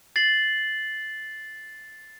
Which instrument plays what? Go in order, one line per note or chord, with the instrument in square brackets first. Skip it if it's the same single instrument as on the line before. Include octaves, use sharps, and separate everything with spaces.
[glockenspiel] A6 C7 F#7